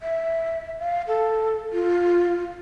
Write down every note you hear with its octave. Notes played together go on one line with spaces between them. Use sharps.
E5
F5
A4
F4